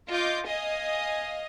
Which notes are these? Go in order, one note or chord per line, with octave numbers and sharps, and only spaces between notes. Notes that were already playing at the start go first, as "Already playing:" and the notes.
F4 D#5 D6 G6
D#5 F5 G#5 D#6